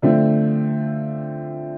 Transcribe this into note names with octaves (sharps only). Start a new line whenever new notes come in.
D3 F3 A3 C4